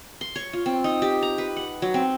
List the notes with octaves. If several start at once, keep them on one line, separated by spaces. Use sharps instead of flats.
C6
C#5
F4
C4
D#4
G4
A#5
B4
F#5
F#3
C4